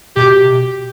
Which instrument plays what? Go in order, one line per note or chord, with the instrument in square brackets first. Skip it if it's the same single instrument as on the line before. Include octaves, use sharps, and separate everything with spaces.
[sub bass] B2 [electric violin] G4